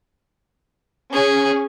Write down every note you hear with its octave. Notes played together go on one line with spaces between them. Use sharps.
C#4 G#4